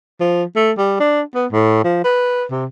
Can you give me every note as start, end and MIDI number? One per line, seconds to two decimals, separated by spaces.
0.20 0.44 53
0.56 0.72 57
0.78 0.96 55
1.00 1.22 62
1.35 1.47 59
1.52 1.83 45
1.84 1.99 53
2.04 2.44 71
2.51 2.66 48